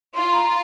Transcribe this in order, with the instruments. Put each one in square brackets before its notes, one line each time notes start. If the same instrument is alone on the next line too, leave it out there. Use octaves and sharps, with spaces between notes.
[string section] F4 [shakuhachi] C6
[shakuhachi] A#5